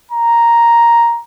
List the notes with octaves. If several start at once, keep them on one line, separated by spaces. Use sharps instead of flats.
A#5